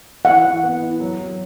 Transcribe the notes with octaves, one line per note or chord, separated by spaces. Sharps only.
E3 F#5
E3
B3
E4
F#3
F#3